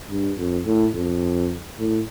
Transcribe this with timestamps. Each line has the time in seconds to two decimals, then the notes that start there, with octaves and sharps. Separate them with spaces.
0.10 G2
0.38 F2
0.66 A2
0.94 F2
1.79 A2